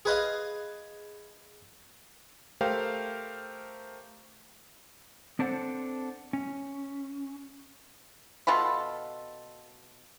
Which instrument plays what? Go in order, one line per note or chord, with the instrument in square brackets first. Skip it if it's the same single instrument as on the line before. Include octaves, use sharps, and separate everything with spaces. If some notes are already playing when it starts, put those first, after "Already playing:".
[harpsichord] G#4 B4 D#5 F5
[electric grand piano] A3 G4 A#4 C5 F5 G5
[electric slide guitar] C4 D4 A4 C5 F#5
C#4
[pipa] B2 F4 A4 B5